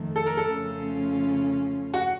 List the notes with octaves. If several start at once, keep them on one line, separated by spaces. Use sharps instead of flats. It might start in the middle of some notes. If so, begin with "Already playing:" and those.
Already playing: F2 D#3 A3
A4
A#4
A4
F2 C#3 A3 C#4 F4
F#4